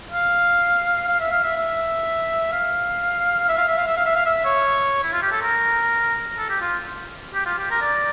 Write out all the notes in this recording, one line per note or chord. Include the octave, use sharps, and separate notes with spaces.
F5
F5
E5
F5
E5
E5
F5
E5
F5
E5
F5
E5
F5
E5
F5
E5
C#5
E4
F4
G4
A4
A#4
A4
G4
F4
G4
F4
G4
A#4
D5